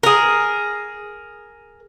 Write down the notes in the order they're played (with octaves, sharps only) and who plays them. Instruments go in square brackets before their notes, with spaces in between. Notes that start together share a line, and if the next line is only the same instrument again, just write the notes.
[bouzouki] G#4 A#4